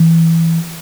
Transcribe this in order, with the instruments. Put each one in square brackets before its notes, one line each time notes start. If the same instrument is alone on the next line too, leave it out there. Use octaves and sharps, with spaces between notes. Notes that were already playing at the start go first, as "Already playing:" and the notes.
Already playing: [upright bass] E3